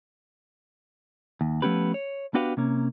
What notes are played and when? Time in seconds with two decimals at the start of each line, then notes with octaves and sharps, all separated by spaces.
1.41 D#2
1.62 F3 A3 B3 C#4 G4 B4
1.94 C#5
2.34 B3 D4 F#4 G4 B4 F5
2.57 C3 A#3 C#4